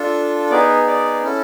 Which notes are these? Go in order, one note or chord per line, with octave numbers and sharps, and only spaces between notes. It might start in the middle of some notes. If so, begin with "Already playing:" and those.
Already playing: D4 F4 A4
B3 D#4 G#4 D5
D5
C#4 E4 A4